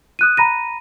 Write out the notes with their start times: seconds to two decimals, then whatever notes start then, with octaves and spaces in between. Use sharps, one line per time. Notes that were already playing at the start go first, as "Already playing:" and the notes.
0.19 D#6 F#6 D#7
0.37 A#5 B5 A#6 D#7